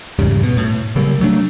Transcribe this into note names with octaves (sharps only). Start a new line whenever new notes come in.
E2 G#2 C#3 G3
B2
A2
C#3 F#3 G3 A#3
C3 F#3 A3 D4